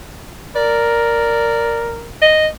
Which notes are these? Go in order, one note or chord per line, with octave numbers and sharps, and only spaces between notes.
A#4 D5
D#5